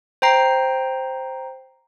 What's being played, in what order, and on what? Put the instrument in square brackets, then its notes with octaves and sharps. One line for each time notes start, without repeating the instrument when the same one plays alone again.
[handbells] C5 G5 A#5 C7